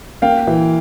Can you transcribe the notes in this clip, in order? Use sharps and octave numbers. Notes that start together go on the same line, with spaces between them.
A#3 F5 G5
E3